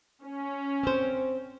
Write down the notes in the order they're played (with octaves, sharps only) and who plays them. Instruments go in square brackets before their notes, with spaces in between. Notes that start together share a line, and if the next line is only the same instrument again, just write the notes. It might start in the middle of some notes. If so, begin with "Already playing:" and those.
[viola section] C#4
[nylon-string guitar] C4 C5